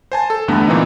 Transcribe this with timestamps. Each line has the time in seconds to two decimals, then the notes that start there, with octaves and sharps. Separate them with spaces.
0.12 C5 G#5 A5
0.30 A4
0.48 E2 G2 D3 A3 B3
0.68 A#2 E3 C4 D#4